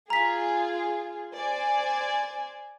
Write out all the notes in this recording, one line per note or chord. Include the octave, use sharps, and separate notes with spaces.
F4 G#4 A#5 B6
C5 D5 G#5